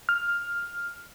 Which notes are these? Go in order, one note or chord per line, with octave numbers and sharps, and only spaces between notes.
F6